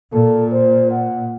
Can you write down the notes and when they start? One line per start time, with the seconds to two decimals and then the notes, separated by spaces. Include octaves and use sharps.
0.13 A#2 A4
0.52 C5
0.91 F#5